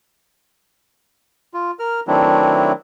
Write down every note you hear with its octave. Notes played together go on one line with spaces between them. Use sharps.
F4
A#4 F6
D#3 F#3 A3 C4 D4 E4